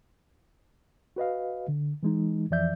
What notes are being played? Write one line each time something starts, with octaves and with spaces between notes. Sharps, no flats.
F#4 B4 D#5 F5
D3
E3 G#3 D#4
F2 E3 F3 D5 E5 G6